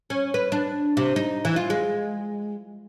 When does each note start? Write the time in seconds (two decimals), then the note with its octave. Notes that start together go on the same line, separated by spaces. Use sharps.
0.10 C#4
0.34 B4
0.52 D4
0.97 C3
1.16 D#4
1.45 E3
1.56 F4
1.70 G#3